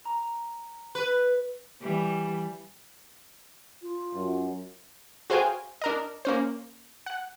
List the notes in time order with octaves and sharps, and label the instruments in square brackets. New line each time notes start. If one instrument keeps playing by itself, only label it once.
[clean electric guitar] A#5
[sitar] B4
[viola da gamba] E3 G3
[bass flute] F4
[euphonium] F#2
[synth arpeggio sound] F#4 G#4 C5 F5 G5 G#5
D4 A#4 D#5
A#3 C#4 C5
F#5